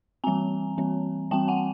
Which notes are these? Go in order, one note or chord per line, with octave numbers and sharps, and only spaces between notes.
E3 G3 C4 G#5 A#5
E3 G3 C4
E3 G3 C4 G5 A5
F#5 G#5